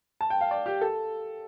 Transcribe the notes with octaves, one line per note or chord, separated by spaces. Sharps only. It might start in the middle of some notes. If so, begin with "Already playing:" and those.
A5
G5
F5
D5
G4
A4